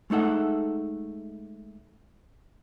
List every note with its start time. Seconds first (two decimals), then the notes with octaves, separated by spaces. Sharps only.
0.10 G#3 A3 D#4 A4 F#5